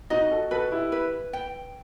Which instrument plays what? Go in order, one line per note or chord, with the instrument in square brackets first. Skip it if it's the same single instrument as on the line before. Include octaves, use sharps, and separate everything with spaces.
[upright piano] D#4 F#4 [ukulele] D#5
[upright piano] F#4 A4
[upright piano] F#4 A4 [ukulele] B4
[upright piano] E4 G4
[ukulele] B4
G5